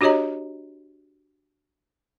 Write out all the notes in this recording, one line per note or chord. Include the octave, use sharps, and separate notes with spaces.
D4 F#4 G4 C#5 D#5 A#5